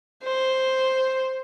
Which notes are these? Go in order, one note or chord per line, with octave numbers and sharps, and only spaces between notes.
C5